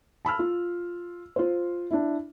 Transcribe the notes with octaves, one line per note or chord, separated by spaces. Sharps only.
A5 B5 E6 F6
F4
F4 C5
D4 E4